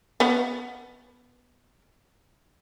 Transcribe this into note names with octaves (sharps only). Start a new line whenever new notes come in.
B3 F#5